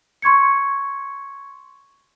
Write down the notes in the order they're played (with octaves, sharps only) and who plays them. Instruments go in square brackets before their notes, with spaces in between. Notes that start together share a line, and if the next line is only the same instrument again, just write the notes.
[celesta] C6 C#6 G#6 C#7